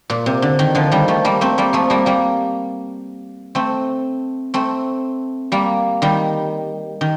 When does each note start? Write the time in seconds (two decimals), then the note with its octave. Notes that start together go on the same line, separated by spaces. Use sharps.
0.10 A#2
0.26 C3
0.42 D3
0.59 D#3
0.75 D3 F3
0.91 D#3 G3
1.08 F3 A3
1.25 G3 A#3
1.41 A3 C4
1.58 G3 A#3
1.73 F3 A3
1.90 G3 A#3
2.06 G3 A#3
3.55 A3 C4
4.54 A3 C4
5.52 G3 A#3
6.02 D#3 G3
7.01 D#3